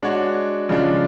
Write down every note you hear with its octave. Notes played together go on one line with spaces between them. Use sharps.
G#3 D4 F#4 C#5
C#3 F3 G#3 D4